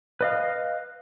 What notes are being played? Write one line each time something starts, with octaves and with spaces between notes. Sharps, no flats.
B4 D#5 F5